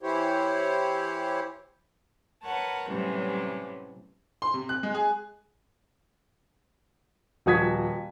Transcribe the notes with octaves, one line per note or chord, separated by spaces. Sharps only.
E3 E4 G4 C5 C#5
A#4 B4 C#5 F#5 A5
A2 C3 E3 F#3 G3 C#4
C6
C3
F#6
G#3
G#4
D#1 F3 F#4 D#6 G#6 B6